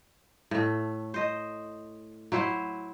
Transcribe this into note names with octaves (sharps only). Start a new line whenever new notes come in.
A2 A3
C5 D#5
F#3 E4 C5